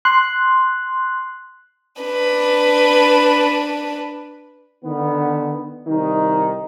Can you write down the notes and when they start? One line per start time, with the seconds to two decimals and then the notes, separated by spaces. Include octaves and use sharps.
0.05 C6 F#6
2.02 D4 B4
4.83 D3 D#3 B3
5.87 C2 D#3 D#4